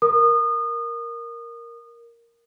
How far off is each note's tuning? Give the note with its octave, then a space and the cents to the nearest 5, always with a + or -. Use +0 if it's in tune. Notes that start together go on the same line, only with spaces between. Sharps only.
A#4 +0 D#6 -30